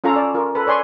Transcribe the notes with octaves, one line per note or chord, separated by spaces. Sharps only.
C#4 F4 A4 F5 A#5
D5
F4 A#4
A4 B4
C#5 D5 G#5 C6 C#6